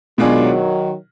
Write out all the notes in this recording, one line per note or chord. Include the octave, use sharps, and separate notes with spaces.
B2 D#3 F#3 G#3 D4 F4 G#4